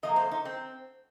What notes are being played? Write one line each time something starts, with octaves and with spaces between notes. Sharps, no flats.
C3 F3 A#3 D#5
C5
D#4
C4